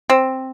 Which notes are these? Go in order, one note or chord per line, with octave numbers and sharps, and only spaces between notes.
C4